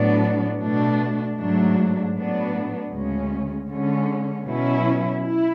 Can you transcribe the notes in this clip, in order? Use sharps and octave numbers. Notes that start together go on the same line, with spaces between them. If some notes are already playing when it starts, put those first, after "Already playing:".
Already playing: A2 F#3 B3 D4
B2 A3 D4
G#2 F#3 A3 D4
A2 F#3 B3 D4
D2 C#3 G#3 C#4
D3 G#3 C#4
B2 F#3 C#4 E4
E4